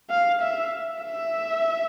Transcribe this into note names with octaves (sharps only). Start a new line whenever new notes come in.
F5
E5
E5